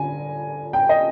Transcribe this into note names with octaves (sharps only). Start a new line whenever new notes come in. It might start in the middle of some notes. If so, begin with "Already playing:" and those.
Already playing: D3 G#5
G5
D#5